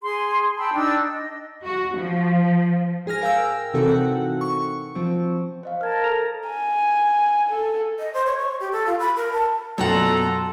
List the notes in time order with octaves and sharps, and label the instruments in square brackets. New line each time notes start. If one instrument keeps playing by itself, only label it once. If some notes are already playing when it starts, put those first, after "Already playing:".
[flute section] G#4 C6
G5 A5 B5 E6
D4 D#4 E6
D#5
[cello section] F#4
F3
[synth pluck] G#2 G#4 G#5 F6 A#6
A#4 F5 G5 E6
C3 E3 C4 D#4 F#4 A4
F#5
C#6
F3 C4
[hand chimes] C5 D#5 F5
[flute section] A#4 A5 [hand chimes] F6 G#6
[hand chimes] A4 [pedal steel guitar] A#5
[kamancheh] G#5
A4
[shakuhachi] D#5
C5
C#5
C#6
G4
A4
F4
B5
A#4
A5
[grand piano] F#2 [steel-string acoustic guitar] B2 F#4 F#5 [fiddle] F4 A#5 [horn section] A4